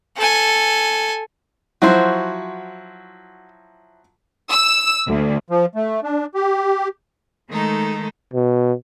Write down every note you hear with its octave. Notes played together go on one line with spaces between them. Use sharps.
A4 G#5
F3 F#3 E4 F#4 C5
E6
D2
F3
A3
D4
G4
D#3 G#3 A3 D#4 A4
B2